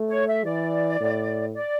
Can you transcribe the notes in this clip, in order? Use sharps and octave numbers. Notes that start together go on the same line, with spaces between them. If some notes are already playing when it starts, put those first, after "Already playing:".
Already playing: A3
C#5
E5
E3 D5
A2
D5